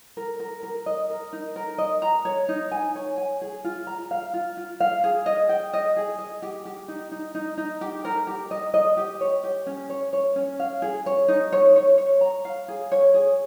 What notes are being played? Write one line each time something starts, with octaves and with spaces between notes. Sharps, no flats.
A#4
A#4
A#4
D#5
A#4
D#4
A#4
D#5
A#5
C#5
D#4
G#5
C#5
G#5
G#4
F4
A#5
F5
F4
F4
F5
G#4
D#5
G5
D#5
G#4
D#5
G4
G4
D#4
D#4
D#4
D#4
G4
A#4
G4
D#5
D#5
G4
C#5
G4
C#4
C#5
C#5
C#4
F5
G#4
C#5
D#4
C#5
C#5
C#5
A#5
F5
G#4
C#5
G#4